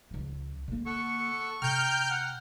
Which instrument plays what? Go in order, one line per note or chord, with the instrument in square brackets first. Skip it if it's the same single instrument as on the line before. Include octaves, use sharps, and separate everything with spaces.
[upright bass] C#2 F3
D3 A#3
[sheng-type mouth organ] A4 F#5 E6 [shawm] C#6
[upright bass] C3 [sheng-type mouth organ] G5 A#5 [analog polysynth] F6 G6
[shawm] F#5 [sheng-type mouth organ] F6